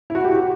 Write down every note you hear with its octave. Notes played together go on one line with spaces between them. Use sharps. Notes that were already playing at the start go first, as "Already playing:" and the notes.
E4
F#4
G4
F#4